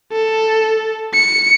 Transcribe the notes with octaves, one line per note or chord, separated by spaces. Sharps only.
A4
C#7